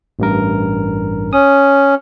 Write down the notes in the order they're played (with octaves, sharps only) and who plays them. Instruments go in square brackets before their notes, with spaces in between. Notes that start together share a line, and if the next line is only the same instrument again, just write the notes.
[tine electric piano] A1 G2 A#4
[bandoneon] C#4 [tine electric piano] D#6